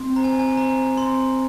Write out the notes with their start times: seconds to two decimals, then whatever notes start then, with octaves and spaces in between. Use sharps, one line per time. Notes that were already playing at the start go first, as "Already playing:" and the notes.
Already playing: C4
0.16 C5 A#5
0.24 G#5
0.39 G#5
0.57 C5 A#5
0.97 C4 C6